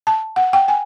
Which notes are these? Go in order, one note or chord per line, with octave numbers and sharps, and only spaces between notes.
A5
F#5
G5
G#5